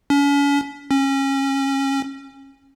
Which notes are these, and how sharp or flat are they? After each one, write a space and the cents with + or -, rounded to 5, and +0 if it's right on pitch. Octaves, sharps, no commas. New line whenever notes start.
C#4 +40
C#4 -25